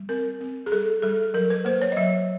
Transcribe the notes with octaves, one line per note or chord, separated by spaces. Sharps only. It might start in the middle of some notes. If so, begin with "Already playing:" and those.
Already playing: G3
C4 A#4
C4
G#4
G3 A4
G3 A4
F#3 A#4
B4
A#3 C5
C#5
D#5
F#3 E5